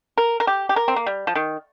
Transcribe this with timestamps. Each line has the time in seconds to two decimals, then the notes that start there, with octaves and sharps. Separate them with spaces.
0.17 A#4
0.40 A#4
0.47 G4
0.69 G4
0.76 A#4
0.88 C4
0.96 A#3
1.06 G3
1.27 F3
1.35 D#3